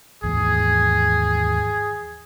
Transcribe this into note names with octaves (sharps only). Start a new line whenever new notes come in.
D#2 G#2 E3 G#4